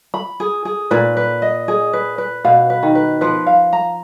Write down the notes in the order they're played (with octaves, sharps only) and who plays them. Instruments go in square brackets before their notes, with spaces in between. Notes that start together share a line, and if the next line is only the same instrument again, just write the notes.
[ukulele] B5
G#4
G#4
[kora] A#2 [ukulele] B4
[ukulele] B4
D#5
G#4
B4
B4
[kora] B2 [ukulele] F5
[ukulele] B4
[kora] D#3
[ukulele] B4
[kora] F3 [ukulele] B4
[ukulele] F5
A#5